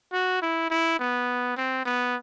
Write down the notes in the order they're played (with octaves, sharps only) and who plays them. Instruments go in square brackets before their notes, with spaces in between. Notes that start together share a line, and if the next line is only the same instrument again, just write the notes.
[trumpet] F#4
E4
E4
B3
C4
B3